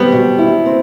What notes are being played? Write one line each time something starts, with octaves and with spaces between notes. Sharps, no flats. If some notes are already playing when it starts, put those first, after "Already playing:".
Already playing: G3 B3 C4
B2
E4
C4